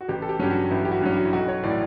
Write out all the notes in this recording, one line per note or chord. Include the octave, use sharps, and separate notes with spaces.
F#4
A1 G4
A4
G4
G2 F#3 C#4 G4
F#4
A1 E4
G4
F#4
G2 F#3 C#4
F#4
E4
B1 F#4
C#5
A2 E3 D5